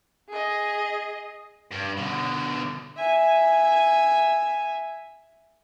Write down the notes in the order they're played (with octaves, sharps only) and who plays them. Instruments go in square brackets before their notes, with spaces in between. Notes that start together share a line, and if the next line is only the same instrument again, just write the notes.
[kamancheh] G#4 D#5
[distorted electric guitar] G2
B2 D3
[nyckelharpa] E5 G#5